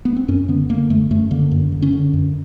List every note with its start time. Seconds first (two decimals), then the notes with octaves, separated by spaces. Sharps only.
0.05 B3
0.17 C4
0.28 F#2 C#4
0.48 D3 B3
0.69 D3 A#3
0.90 F#2 A3
1.10 F#2 A3
1.31 D3 A#3
1.51 F#2
1.72 D3
1.82 C#4
1.92 D3
2.13 F#2